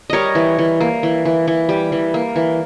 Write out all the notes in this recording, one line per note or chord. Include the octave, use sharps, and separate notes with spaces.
G3 A#4 C#5 D#5
E3
E3
A#3
E3
E3
E3
G3
E3
A#3
E3